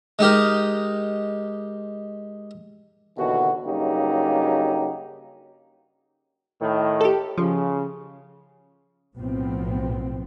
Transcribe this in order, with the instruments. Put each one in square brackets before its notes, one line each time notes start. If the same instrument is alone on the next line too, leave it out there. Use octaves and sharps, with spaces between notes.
[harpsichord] G#3 D#4 G4 A#4
[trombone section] D#2 B2 D3 E3 F#4
G2 C#3 F#3 A#3 D#4 G4
A2 D#3
[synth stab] G4 A4
[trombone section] C#3 [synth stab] F3
[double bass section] B1 A2 F3 B3 C4